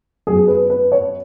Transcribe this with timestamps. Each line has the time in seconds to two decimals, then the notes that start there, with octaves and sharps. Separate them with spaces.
0.27 F#2 F#3 B3 G#4
0.48 B4
0.70 B4
0.92 C#5